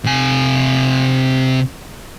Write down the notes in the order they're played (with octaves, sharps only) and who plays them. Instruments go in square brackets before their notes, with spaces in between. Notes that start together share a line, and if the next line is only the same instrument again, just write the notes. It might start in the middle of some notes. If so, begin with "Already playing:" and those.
[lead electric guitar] C3 G#5